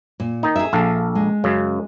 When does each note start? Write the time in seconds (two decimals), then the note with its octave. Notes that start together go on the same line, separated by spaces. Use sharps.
0.20 A#2
0.43 D#3 D#4
0.56 G#4 E5
0.73 A#1 A4 F5
1.15 G#3
1.44 F#2 C#3